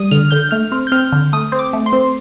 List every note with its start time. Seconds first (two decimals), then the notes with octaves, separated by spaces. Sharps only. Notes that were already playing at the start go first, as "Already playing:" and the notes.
Already playing: G3 D#6
0.11 D3 F6
0.31 D3 G6
0.51 A3 F6
0.72 C4
0.87 G6
0.92 C4 F6
1.13 D3
1.33 A3 D#6
1.52 C4
1.59 D6
1.73 A3
1.86 C6
1.93 C4